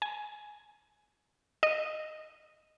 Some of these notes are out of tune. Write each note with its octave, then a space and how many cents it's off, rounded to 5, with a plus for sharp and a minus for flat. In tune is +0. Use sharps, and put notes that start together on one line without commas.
G#5 +10
D#5 -10